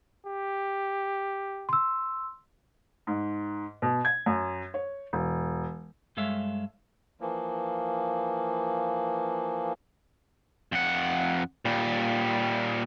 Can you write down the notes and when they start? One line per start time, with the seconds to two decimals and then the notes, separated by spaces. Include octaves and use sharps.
0.26 G4
1.69 C6 E6
3.07 G#2
3.82 B2
4.05 G#6
4.26 F#2
4.74 C#5
5.13 E1
6.17 G2 G#3 A4 C#5 E5 F5
7.21 E3 F3 A#3
10.72 F2 F#5
11.65 A#2 G3